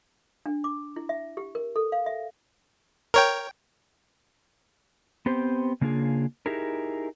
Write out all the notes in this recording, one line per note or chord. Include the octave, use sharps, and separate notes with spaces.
D4
D6
E4
E5
G4
A#4
A4
F5
E5
A#4 C#5 G5
B3 C4 G4 C5
C#3 A#3 D4 F4 G#4
D#4 E4 G4 G#4 A#4